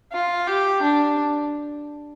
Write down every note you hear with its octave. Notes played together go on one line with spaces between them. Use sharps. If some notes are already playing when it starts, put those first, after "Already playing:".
F4
G4
D4